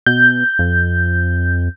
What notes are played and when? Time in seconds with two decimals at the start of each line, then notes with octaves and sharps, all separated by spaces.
0.06 B2 G6
0.59 F2